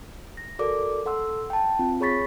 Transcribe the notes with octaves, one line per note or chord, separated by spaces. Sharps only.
A#6
F#4 A4 A#4 D5 D6
A4 F#5 C6 E6
G5 A5
C4 F4
G#4 C#5 B5 C#6 A6 B6